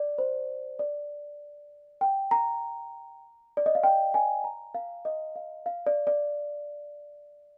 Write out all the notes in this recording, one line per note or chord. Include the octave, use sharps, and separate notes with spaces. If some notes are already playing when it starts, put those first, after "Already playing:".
Already playing: D5
C5
D5
G5
A#5
D5
D#5
F5
G5
G#5
A#5
F5
D#5
F5
F5
D5
D5